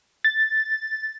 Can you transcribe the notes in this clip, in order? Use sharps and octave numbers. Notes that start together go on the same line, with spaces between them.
A6